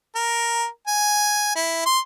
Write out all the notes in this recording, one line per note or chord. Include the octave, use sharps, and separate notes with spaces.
A#4
G#5
E4
C6